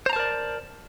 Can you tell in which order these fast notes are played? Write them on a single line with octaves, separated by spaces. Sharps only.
C5 A#5 A5 A#4 D5